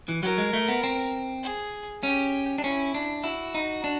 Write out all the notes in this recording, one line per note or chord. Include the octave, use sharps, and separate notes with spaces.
E3
F#3 A#4
G#3
A3
B3
C4
G#4
C#4 G4
D4
C#4 E4
D4
E4 F#4
D#4
D4